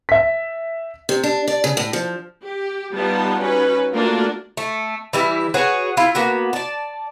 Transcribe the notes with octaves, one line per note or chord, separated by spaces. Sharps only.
E5 B6
C3
D4
D5
C#3
A2
F3
G4
G3 B3 D#4 F4 A5
C#4 D#4 F#4 B4
A3 A#3 D4 F4 F#4 A#4
A3
E3 G3 E4
F#4 G#4 B4 C#5
E4 F4
A#3 B3 F#4
D5 A5